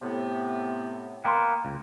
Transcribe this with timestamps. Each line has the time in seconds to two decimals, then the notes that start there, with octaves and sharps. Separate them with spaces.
0.01 A2 C3 B3
1.25 A#3 B3 G5 A#5 C6
1.65 C#2